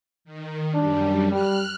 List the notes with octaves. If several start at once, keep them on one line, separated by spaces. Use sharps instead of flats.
D#3
F#2 G3 D4
G3 F6 F#6